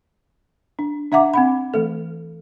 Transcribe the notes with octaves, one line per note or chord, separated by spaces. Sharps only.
D4
D4 E5 F#5 A#5 D6
C4 F#5 B5
E3 A3 A4